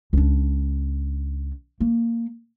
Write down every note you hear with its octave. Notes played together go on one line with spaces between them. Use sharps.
C#2 D4
A#3